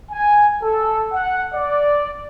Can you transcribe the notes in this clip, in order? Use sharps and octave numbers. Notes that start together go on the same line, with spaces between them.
G#5
A4
F#5
D5